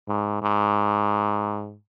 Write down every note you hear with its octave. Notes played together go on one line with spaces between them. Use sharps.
G#2
G#2